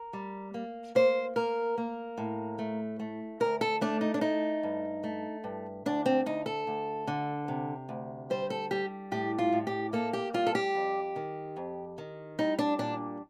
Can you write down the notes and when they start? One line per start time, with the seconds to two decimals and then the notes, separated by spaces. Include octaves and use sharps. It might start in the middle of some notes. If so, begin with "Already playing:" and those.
Already playing: A#4
0.13 G3
0.54 A#3
0.95 A#3 C5
1.36 A#3 A#4
1.78 A#3
2.18 A2
2.59 A3
2.99 A3
3.40 D2 A#4
3.61 A4
3.81 A3 D4
4.01 D#4
4.14 D4
4.21 A3 D#4
4.63 G2
5.04 A3
5.44 G2
5.86 D2 D4
6.06 C4
6.26 D2 D#4
6.46 A4
6.67 D2
7.07 D3
7.48 C3
7.89 D2
8.30 G3 C5
8.50 A4
8.71 G3 G4
9.12 A2 G4
9.39 F4
9.52 A2
9.67 G4
9.93 A#3 A4
10.13 G4
10.34 G3 F4
10.46 A4
10.55 G4
10.75 F2
11.16 D#3
11.57 F2
11.98 D#3
12.39 G3 D#4
12.59 D4
12.79 A#2 D4